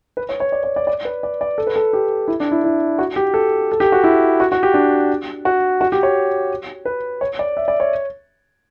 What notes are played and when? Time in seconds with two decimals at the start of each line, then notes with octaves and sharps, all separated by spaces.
0.17 B4
0.29 C#5
0.40 C#5
0.52 D5
0.64 C#5
0.76 D5
0.87 D5
1.05 B4
1.23 D5
1.41 D5
1.58 A4
1.67 B4
1.76 A4
1.93 G4
2.28 E4
2.40 D4
2.52 E4
2.64 E4
2.99 F#4
3.16 G4
3.34 A4
3.72 A4
3.80 G4
3.92 F#4
4.04 E4
4.40 F#4
4.52 F#4
4.63 G4
4.74 D4
5.45 F#4
5.81 F#4
5.92 G4
6.03 C#5
6.85 B4
7.21 C#5
7.39 D5
7.57 E5
7.68 D5
7.80 C#5